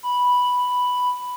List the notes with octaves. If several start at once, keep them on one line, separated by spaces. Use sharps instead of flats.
B5